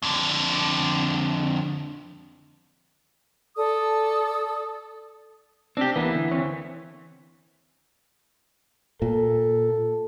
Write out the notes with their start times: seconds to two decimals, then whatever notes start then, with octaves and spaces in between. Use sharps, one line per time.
0.02 F2 D3
3.55 A4 D5 D#6
5.77 C4 D4 G4
5.96 D2 E3 A#3 B3
6.15 D3
6.31 C4 C#5
9.02 A#2 A4